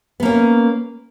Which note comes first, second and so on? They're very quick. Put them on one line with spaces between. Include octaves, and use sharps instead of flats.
B3 A#3 C#4